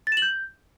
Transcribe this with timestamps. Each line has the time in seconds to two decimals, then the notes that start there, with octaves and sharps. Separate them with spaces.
0.07 A6
0.12 E7
0.17 F#7
0.22 G6